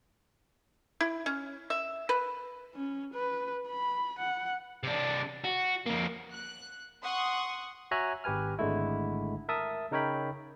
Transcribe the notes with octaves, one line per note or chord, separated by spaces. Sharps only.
E4
C#4
E5
B4
C#4
B4
B5
F#5
C3 D4
F#4
F2 A#3
F#6
F#5 C6 C#6 D#6
F#4 C#5 E5 G#5 A#5 F#6
G#1 G4 B4 G#5 F6
G#1 D3 G#3 A3 E4
A#4 E5 A5 D#6
C#3 D#4 A#4 C#5 G5 B5